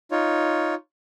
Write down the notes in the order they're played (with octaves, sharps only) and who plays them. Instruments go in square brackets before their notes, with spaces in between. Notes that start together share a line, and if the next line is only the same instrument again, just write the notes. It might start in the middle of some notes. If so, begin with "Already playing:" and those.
[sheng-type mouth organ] D#4 F4 C#5